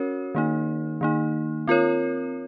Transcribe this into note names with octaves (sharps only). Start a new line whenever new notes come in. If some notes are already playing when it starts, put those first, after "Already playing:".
Already playing: C#4 F#4 A#4 C#5
D#3 A#3 D#4
D#3 A#3 D#4
C4 F4 A#4 C#5